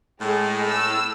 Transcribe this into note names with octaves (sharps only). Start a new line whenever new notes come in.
A2 G#3
E6